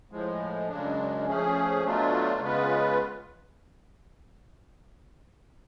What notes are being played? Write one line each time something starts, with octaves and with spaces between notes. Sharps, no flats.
A2 F3 G#3
F#2 C#3 G#3 D4
F3 A3 C#4 G#4
B2 F#3 A3 D4 F4
C#3 G#3 B3 F4 B4